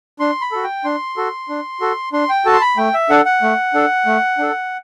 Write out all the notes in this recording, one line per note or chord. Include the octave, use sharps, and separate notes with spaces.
D4 C6
B5
F#4 A4
G5
D4 C6
F#4 A4
D4
F#4 A4
D4 C6
G5
F#4 A4 A5
C6
B5
A3 G5
E5
D4 A4 F#5
F#5
A3
D4 A4
A3
D4 A4